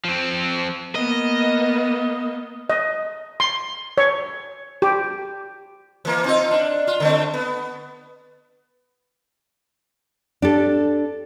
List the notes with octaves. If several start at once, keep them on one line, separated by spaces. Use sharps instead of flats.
F3 C4
A#3 B3 D#5
D#5
C6
C#5
G4
E3 A#3
C4 D#4 F4
D4
F4
D3 A3 C4
B3
D4 G4 A4